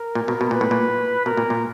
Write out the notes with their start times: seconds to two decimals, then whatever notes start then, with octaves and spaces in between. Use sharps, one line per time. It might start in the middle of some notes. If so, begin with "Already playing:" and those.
Already playing: A#4
0.15 A#2
0.28 B2
0.41 B2
0.51 A#2 B4
0.61 A2
0.71 A#2
1.25 B2 A#4
1.37 A#2
1.50 A#2